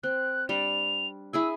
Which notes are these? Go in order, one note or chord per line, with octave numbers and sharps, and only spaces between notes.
C4 F#6
G3 D4 F7
E4 G#4 G#5 E6